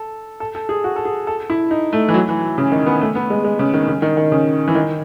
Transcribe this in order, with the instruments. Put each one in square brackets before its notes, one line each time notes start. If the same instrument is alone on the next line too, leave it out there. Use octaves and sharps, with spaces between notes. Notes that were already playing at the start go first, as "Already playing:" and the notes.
Already playing: [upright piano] A4
A4
A4
G#4
F#4
A4
G#4
A4
E4
D#4
A3
E3
F#3
E3
C#3
D#3
B3
A3
B3
G#3
G#3
C#3
D#3
C#3
D#3
D#3
C#3
E3
D#3